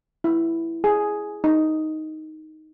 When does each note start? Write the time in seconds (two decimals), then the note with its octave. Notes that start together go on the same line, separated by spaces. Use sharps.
0.24 E4
0.84 G#4
1.44 D#4